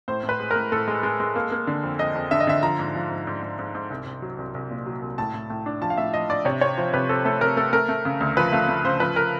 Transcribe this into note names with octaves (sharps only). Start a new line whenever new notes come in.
A2 C5
A2
B4
G#3
A#4
A2
A2 A4
G#3
G#3
G#3
A#3
A#3
D3
F2
F2 D#5
F2
D3 E5
D#5
D3 E5
F3 A#5
G#2
F3
G#2
G#2
G#2
G#2
G#2
C2
C2
F#3
C2
C2
A#2
F#3
C2
A2 A5
A2
A2
D4
F3 A5
F5
A2 E5
F3 D#5
D4 D5
C3 C#5
C4 C#5
F3 C5
C3 B4
C4 A4
A3 A4
C3 A#4
A3 A4
A3 A#4
A3
C#3
D2
F3 B4
A3 F5
A3
C#3 C5
F3 B4
A#4